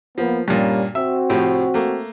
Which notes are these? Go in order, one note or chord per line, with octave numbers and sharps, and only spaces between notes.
F3 A#3 B3
G2 A#2 G3 A#3 C#4
C4 F#4 E5
A2 C3 F3
A3 A#3